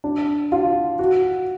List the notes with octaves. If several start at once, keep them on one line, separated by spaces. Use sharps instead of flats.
D4
F4
F#4